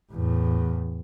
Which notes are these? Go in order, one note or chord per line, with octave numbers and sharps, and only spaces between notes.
E2 A2